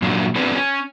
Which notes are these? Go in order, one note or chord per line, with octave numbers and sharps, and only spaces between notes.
A#2 F#3 D4 F4
B3 C4 D4 F4 G#4 B4
C#4